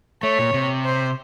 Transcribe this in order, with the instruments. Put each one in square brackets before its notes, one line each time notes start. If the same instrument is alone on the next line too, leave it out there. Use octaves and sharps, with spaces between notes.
[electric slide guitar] A3 [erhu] C#5
[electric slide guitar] A#2
C3
[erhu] C5